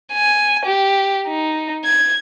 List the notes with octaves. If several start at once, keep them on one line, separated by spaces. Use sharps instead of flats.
G#5
G4
D#4
G#6